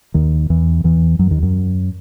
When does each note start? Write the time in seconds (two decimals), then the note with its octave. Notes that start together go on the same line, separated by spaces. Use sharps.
0.14 D#2 D#3
0.50 E2 E3
0.84 E2 E3
1.19 F#2 F#3
1.31 D#2 D#3
1.43 F#2 F#3